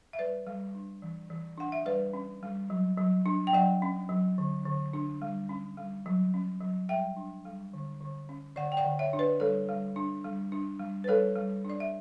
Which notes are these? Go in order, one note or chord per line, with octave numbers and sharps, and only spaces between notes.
E5
G3 B4 D5
G3
D4
E3
E3
D4 F#5
E5
G3 B4 D5
C#4
G3
F#3
F#3
D4
G5
F#3 D5 F#5
C#4
F#3
D3
D3
D4
G3
C#4
G3
F#3
C#4
F#3
G3 E5 G5
D4
G3
D3
D3
C#4
D3 D5 F#5
G5
D5 F#5
D3
C#5 E5
D4
B4 D5
G3 A4 C#5
G3
D4
G3
D4
G3
B4
G3 A4 C#5
G3
D4
D5
E5